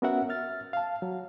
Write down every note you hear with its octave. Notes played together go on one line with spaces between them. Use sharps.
B3 C#4 F#4 A#4 E5 F#5
E5 F6 A6
F5 A5
F#3